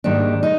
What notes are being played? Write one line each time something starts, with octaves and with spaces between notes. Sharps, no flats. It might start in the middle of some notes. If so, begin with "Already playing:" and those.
G#2 D#3 G3 A#3 D4
D#4